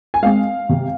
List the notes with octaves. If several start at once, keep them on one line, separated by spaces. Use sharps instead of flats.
G#5
G#3 C4 F5
C3